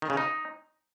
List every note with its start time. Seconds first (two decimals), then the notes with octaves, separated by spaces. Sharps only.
0.02 D#3
0.10 C#3
0.17 D#4